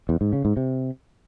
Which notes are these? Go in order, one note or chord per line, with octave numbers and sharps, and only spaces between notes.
E2
G#2
C#3
G#2
C3